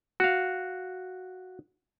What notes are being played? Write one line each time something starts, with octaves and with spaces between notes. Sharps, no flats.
F#4 F5